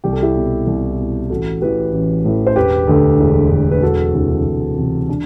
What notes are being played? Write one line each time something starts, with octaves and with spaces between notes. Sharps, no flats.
C2 G4
A4
E4 G4
B2
C2
B2
A1 F#4 A4
A2 E3 G4 B4
A1
A2 E3
C5
E1 G4 B4
D2 D3
E1
D2 D3
B4
E1 F#4 A4
D2 C3 E3
E1
D2 C3 E3
D4